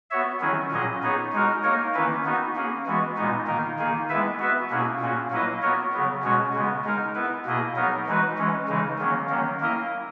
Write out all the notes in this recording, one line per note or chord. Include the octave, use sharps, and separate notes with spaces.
B3 F#4 C#5 E5
D#3 F#3 C#4 E4 G#4
A#2 F#3 C#4 G#4 D#5
B3 D#4 G#4 C#5
G#3 D#4 F#4 A#4
A#3 D#4 A#4 C#5
D#3 A#3 C#4 E4 B4
B3 D#4 F#4
A#3 C#4 G#4
E3 G#3 B3 F#4
A#2 G#3 B3 D#4
D#3 A#3 D#4 A#4
D#3 A#3 D#4 G#4
G#3 B3 E4 B4 E5
B3 F#4 B4 E5
B2 A#3 C#4 E4 G#4
A#2 A#3 C#4 F#4
F#3 A#3 E4 B4 D#5
B3 F#4 A#4 C#5
C#3 F#3 B3
B2 G#3 C#4 F#4 C#5
C#3 G#3 B3
G#3 D#4 A#4
B3 E4 B4
B2 A#3 E4 G#4 D#5
F#3 B3 D#4 A#4
E3 G#3 D#4 F#4 B4
E3 G#3 C#4
C#3 E3 G#3 D#4
D#3 F#3 A#3 C#4
D#3 F#3 A#3 C#4
A#3 E4 A#4 D#5